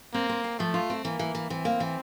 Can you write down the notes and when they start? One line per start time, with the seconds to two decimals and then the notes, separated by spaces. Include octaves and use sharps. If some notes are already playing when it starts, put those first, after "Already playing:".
0.14 A#3 C4
0.29 C4
0.44 C4
0.59 F3 A3
0.74 F4
0.90 C4
1.05 E3 A#3
1.19 E3
1.35 E3
1.50 E3 C4
1.65 A#3
1.80 E3